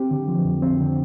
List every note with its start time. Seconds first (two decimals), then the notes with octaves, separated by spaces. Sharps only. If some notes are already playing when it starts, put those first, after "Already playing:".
Already playing: C4 G4
0.11 D3
0.28 F3
0.45 F2
0.62 C4
0.81 D3